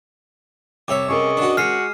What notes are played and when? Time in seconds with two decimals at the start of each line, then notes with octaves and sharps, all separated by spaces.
0.88 C2 C#5 E5 D6
1.08 C#4 G#4 A#4 D#5 C#6
1.37 D4 F#4
1.57 G#3 F#4 F6 C7